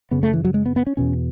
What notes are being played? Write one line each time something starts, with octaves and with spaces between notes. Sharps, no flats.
F#2 C#3 B3
A3
E3
F#3
G#3
B3
B3
C#4
E2 B2 C#4